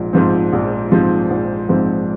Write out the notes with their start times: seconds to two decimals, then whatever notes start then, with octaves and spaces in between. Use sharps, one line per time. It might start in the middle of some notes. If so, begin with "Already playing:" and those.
Already playing: A#1 G#2 F3
0.13 G#2 F3 C4
0.53 A#1
0.92 G#2 F3 C4
1.30 A#1
1.69 G#2 F3 C4